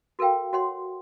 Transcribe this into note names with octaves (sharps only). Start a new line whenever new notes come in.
F#4 A4 A#4 F5 G5
F#4 C#5 F#5 C6